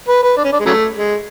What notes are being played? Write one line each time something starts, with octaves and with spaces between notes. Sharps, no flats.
B4
B4
D4
C#4
D4
G#3
C#3 F#3 A3
G#3